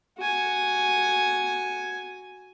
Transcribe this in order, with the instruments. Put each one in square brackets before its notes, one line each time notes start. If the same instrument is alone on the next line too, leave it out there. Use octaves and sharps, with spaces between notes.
[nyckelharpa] F#4 G#5